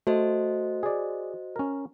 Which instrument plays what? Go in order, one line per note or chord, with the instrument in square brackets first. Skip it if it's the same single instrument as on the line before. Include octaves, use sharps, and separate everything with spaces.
[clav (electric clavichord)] A3 [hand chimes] F#4 C5 D#5
[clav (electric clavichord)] G#4 D5
C#4 A#4